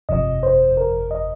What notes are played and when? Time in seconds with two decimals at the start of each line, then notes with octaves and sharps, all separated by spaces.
0.09 G1 F2 C3 F3 D#5
0.43 C5
0.77 A#4
1.11 D#5